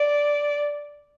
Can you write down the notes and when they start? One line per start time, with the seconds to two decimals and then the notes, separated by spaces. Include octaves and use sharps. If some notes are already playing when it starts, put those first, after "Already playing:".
Already playing: D5